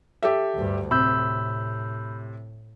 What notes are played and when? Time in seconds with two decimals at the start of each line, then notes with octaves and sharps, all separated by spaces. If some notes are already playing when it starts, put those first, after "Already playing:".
0.23 G4 A4 E5
0.54 D2 G2
0.91 A2 C3 B5 E6 G6